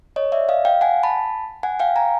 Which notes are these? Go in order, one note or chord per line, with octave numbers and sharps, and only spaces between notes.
C#5 D#5
D5 E5
D#5 F5
F5 G5
F#5 G#5
A5 B5
F#5 G#5
F5 G5
G#5 A#5